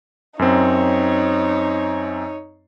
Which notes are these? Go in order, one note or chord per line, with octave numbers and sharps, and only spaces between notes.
F#2 C4 D#4 C#5